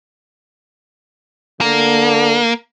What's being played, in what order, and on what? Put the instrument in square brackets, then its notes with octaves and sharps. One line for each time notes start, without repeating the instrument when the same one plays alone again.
[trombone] D3 [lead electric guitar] A#3